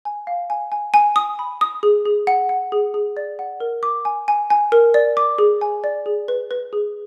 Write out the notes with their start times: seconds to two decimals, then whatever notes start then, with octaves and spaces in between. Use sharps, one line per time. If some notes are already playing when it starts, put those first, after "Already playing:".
0.05 G#5
0.27 F5
0.50 G#5
0.72 G#5
0.94 G#5
1.16 D#6
1.39 B5
1.61 D#6
1.83 G#4
2.05 G#4
2.27 F#5
2.49 F#5
2.72 G#4
2.94 G#4
3.17 D5
3.39 F#5
3.60 A#4
3.83 D6
4.05 G#5
4.28 G#5
4.50 G#5
4.72 A#4
4.94 D5
5.17 D6
5.38 G#4
5.61 G#5
5.84 D5
6.06 G#4
6.28 B4
6.51 B4
6.73 G#4